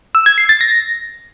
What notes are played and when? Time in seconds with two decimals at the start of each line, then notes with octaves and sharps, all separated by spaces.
0.15 E6
0.26 G#6
0.38 C7
0.49 A6
0.61 A#6